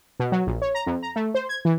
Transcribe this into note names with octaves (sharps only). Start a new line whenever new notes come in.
B2
F#3
A#1
C#5
A#5
F2
A#5
A3
C5
G#6
E3